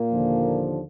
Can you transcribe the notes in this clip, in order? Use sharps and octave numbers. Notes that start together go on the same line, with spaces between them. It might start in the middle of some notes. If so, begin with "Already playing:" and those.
Already playing: A#2 A#3
D#2 D3 F3